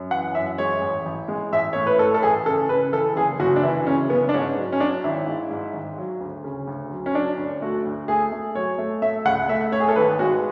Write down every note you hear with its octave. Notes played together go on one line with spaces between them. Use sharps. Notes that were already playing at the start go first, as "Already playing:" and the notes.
Already playing: F#2
E3 F#5
F#2 E5
G#3 C#5
A1
A1
G#3
A1 E5
A2 C#5
B4
A2 A4
A4
A1 G#4
C#3 A4
C#3 B4
E3 A4
F#1 G#4
F#1 F#4
D4
E3 E4
C#3 C#4
F#1 B3
D4
G#2 C#4
F#3
C#4
F#3 D4
G#1 E4
G#2
G#2
G#1
F#3
D2
C#3
D2
F#3
C#4
F#3 D4
D2
A3 F#4
D2
A3 G#4
A3
F#3 C#5
A3
A3 E5
C#2 F#5
A3 E5
A3 C#5
G#4
A4
G#1 B4
G#3 F#4